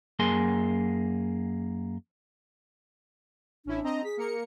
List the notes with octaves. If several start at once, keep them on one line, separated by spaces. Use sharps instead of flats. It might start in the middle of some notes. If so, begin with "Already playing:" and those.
F#2 A#3 G#4 G#5 C6
A1 C#4 D4 E4
C4 D#5 A#5
G#4 B6
A#3 A#4 C#7